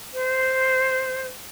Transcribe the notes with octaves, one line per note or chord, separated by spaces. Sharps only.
C5